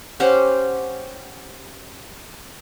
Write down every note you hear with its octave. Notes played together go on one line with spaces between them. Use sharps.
C#4 G4 C5 F#5